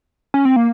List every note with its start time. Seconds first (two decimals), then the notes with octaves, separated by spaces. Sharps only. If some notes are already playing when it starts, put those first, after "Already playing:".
0.34 C#4
0.45 C4
0.56 A#3